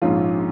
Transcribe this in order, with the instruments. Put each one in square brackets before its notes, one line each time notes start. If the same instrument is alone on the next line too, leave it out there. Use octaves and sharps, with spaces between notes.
[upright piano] A#1 G#2 F3 C#4 F4